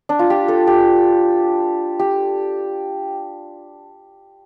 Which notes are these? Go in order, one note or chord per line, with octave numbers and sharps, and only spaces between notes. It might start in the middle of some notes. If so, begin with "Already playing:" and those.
D4
F4
G4
A4
G4
G4